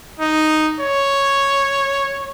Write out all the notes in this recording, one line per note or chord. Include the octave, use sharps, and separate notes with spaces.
D#4
C#5